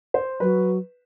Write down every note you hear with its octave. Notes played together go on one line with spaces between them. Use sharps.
C5
F#3 B4